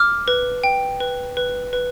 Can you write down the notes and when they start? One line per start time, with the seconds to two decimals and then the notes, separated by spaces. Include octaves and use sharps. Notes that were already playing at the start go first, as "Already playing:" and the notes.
Already playing: D6 F6
0.28 B4
0.64 G5
1.00 B4
1.37 B4
1.73 B4